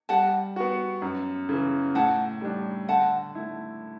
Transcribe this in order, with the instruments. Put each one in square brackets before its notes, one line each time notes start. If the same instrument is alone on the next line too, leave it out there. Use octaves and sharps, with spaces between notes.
[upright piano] G3 [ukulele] F#5 A5
[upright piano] B3 F#4
F#2
C#3 E3
[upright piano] A2 [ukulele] F#5 A5
[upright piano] G3 D4
[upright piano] D3 [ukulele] F#5 A5
[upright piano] A3 E4